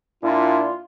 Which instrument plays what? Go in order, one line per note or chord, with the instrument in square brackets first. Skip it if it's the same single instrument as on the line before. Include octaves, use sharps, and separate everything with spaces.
[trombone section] A#2 D4 E4 [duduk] F4